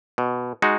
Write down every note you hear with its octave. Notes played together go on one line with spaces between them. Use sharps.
B2
G#3 D#4 F#4